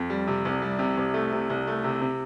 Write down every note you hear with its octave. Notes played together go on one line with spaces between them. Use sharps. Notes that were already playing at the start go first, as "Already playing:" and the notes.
Already playing: F2
G3
C3
C2
G3
C3
C2
A3
C3
C2
A3
C3
C3